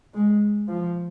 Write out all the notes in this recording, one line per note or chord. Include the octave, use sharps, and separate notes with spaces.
G#3
F3